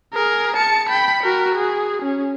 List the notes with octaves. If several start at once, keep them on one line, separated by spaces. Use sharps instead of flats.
G#4 A#4
A5 C#7
G5 B5
F#4 A#4
G#4
C#4